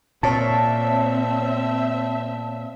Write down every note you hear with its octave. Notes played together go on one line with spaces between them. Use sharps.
A#2 C4 C#5 E5 A5